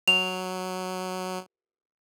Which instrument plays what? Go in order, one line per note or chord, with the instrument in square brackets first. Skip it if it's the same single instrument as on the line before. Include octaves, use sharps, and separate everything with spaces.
[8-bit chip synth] F#3 [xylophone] F7